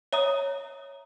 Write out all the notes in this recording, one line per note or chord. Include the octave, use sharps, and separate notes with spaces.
C#5 E5 A#5 D#6